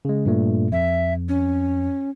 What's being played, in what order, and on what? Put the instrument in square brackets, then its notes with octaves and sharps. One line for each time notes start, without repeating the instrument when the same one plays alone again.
[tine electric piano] C#3 G#3
G2 A#2 A3
[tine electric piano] F2 [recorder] E5
[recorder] C#4